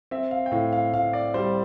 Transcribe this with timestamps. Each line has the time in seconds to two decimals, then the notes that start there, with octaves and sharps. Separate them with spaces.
0.11 C4 E5
0.31 F5
0.46 G5
0.52 A2 F5
0.73 F5
0.93 A2 F5
1.13 D5
1.34 G3 C5